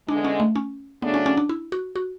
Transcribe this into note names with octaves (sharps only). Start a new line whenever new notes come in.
E2 D3 G#3 D4
C#4
A3
C#4
C#3 F#3 A3 B3 D4
C#4
C#4
D4
E4
F#4
F#4